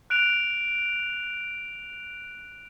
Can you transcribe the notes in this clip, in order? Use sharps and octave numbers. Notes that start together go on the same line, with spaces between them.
F#6 D7 F7